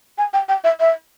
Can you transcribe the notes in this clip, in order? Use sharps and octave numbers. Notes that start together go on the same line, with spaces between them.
G#5
G5
G5
E5
E5